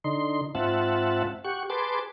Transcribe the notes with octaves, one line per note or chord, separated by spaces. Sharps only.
D3 D#4 C6
G#2 C4 F4 E5 F#5 A5
G4 F#5 C#6
G#4 B4 A5 C6 D6